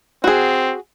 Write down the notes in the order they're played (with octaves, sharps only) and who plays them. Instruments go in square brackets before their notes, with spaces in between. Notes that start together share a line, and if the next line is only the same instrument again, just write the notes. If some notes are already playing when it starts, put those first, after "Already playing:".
[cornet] C4 [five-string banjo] F#4 G#4